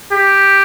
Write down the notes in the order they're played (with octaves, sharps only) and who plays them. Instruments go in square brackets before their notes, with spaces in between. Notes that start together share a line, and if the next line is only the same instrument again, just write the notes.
[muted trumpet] G4